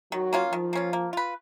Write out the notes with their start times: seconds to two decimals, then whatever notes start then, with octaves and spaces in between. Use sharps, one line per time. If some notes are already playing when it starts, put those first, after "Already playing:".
0.12 D#3 F#3
0.33 A#3 C#4 F4
0.53 D#3 F3
0.73 A#3 C#4 F4
0.93 A#3
1.13 F4 B4